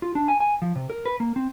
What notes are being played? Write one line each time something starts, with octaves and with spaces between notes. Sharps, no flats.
F4
D4
G#5
G#5
F3
C3
A#4
B4
A#3
C4